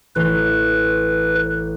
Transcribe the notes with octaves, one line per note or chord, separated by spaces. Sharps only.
A1 B4